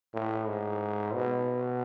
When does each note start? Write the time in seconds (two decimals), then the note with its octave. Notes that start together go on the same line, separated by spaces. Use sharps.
0.14 A2
0.47 G#2
1.14 B2